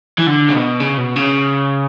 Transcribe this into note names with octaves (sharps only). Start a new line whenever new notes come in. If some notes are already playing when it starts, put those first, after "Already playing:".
E3
D3
C#3
B2
C#3
B2
C#3